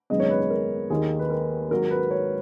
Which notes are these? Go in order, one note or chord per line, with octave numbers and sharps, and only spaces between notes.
G#1 F#2 C#3 G#3 B3 D#5
C#5
B4
B4
A#4
D#2 D#3 A#3 G#4
B4
A#4
G#1 G#2 F#3 A#4
B4
C#5